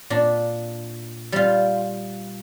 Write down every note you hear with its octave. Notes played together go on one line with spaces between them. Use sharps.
A#2 D4
G3 F4